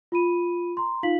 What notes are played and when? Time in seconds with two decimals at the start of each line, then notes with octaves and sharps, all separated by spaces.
0.12 F4 B5 D#7
0.77 A#5 C6
1.03 D#4 F4 F5 B6 F#7